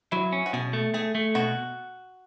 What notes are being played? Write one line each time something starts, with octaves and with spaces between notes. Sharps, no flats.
F#3 E4
C#4
F#4
B2 G#4
A3
A3 G#4
A3
B2 F#4